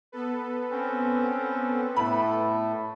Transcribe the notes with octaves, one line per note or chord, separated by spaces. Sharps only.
B3 A4 B4
C4 C#4
A2 A3 B5